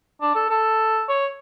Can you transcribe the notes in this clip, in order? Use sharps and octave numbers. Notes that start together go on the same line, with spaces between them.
D4
A4
A4
C#5